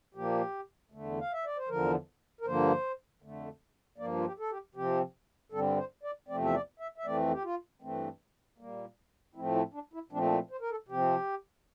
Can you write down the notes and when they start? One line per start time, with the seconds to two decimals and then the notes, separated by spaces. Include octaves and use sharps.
0.15 A#2 F3 A#3 G4
0.92 E2 D3 A3
1.20 F5
1.33 E5
1.45 D5
1.57 C5
1.68 E2 D3 F3 A#4
2.41 A#4
2.45 G2 D3 F3 A#3 C5
3.22 F2 D3 A3
3.98 G2 F3 A#3 D5
4.17 F4
4.25 G4
4.39 A4
4.50 G4
4.75 C3 F3 C4 G4
5.52 G2 D3 G3 C4 A4
5.77 C5
6.03 D5
6.28 E2 C3 F3 A3 C4 D5
6.44 E5
6.54 D5
6.80 E5
6.98 E5
7.05 F2 E3 A3 C4 D5
7.32 G4
7.44 F4
7.82 G2 E3 A3 C4
8.58 A#2 G3 A#3
9.35 A2 F3 A3 C4 E4
9.55 E4
9.74 D4
9.93 E4
10.12 A#2 F3 A3 C4 D4
10.25 D4
10.32 E4
10.51 C5
10.61 A#4
10.70 A4
10.88 C3 F3 C4 G4